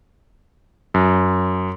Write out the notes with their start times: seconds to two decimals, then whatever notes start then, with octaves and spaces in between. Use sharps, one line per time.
0.94 F#2